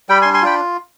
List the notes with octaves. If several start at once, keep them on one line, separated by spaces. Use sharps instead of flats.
G3 G5 B5
G#5 C6
D4
G#5 C6
F4 G5 B5